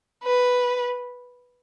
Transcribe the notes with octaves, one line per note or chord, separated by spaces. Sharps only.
B4